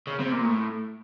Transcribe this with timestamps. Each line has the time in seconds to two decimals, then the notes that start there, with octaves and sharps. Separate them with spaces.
0.07 C#3
0.19 C3
0.32 A#2
0.45 A2